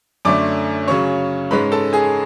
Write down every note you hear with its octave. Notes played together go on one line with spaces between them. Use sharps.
F#2 D3 A3 C#4 D5 D6
C#3 F#3 C#4 C#5 C#6
G#2 G#3 C#4 B4 B5
A4 A5
G#4 G#5